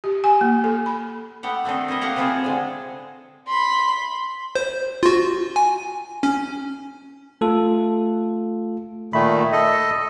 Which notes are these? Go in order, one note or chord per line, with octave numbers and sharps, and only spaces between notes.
G4
G#5
A#3
A4
B5
A3 B3 G4 F#5
D#3 A3 C4 D4 D#4
D#4 E4 A#4 D#5
A3 A#3 G4 F5 F#5 A#5
C3 E3 F3 F4 G#4 A4
D3 G#3
B5 C6
C5
F4 F#4
G#5
C#4
A3 F4 A4
A#2 D#3 A3 B5
A4 D#5